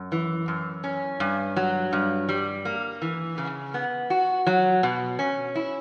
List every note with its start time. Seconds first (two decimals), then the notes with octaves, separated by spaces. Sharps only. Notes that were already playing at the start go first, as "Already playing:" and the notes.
Already playing: F#2
0.12 E3
0.48 F#2
0.84 C#4
1.20 G2
1.56 F#3
1.93 G2
2.29 G3
2.65 A#3
3.02 E3
3.38 C#3
3.74 B3
4.10 F#4
4.47 F#3
4.83 B2
5.19 C#4
5.55 E4